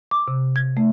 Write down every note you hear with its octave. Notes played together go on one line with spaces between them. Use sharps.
D6
C3
G#6
A3